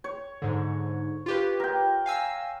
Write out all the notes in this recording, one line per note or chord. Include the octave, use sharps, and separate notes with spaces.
C#5
G#2 D3
F4 G4 B4
A#4 G5
F5 G#5 E6